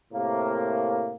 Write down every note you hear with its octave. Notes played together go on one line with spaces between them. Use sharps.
A2 C3 A#3